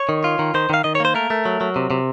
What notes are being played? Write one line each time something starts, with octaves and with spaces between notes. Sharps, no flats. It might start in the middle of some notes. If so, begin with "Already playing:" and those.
Already playing: C#5
D#3
F4
D#3
D#3 C5
D#3 F5
D#3 D#5
C#5
A#3 C5
A3 A#4
A3
F#3
F#3
C3
C3